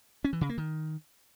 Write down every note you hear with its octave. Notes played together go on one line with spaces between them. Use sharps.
C#4
E3
C#3
A#3
D#3